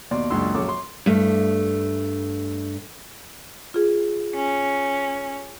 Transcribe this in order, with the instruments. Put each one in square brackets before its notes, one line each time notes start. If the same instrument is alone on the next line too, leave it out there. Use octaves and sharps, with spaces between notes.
[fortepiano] D#2 B2 D5 C6
C#2 F#2 A#2 D4 C6 E6
A#1 F#3 C#4 A4 C#5 D6
C6
[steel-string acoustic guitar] G2 A3
[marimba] F4 G#4
[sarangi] C#4